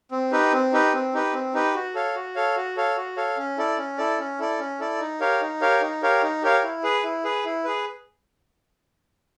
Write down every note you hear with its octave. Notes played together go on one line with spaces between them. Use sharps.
C4
D#4 G4 B4
C4
D#4 G4 B4
C4
D#4 G4 B4
C4
D#4 G4 B4
F#4
A4 C#5 F5
F#4
A4 C#5 F5
F#4
A4 C#5 F5
F#4
A4 C#5 F5
C#4
E4 A4 D5
C#4
E4 A4 D5
C#4
E4 A4 D5
C#4
E4 A4 D5
D#4
G4 A#4 C#5 F5
D#4
G4 A#4 C#5 F5
D#4
G4 A#4 C#5 F5
D#4
G4 A#4 C#5 F5
E4
G#4 B4
E4
G#4 B4
E4
G#4 B4